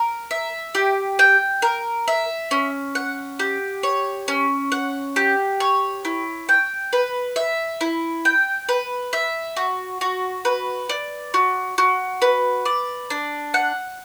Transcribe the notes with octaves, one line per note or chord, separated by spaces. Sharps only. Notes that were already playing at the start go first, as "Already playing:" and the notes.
Already playing: A#4
E5
G4
G5
A#4
E5
C#4
F#5
G4
C#5
C#4
F#5
G4
C#5
E4
G5
B4
E5
E4
G5
B4
E5
F#4
F#4
B4
D5
F#4
F#4
B4
D5
D4
F#5